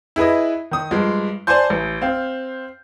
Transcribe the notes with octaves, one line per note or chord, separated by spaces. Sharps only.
E4 G#4 B4 D#5
D#3 D#6
G2 F3 G#3
C5 D5 G#5 A5 C6 G6
A1
C4 F5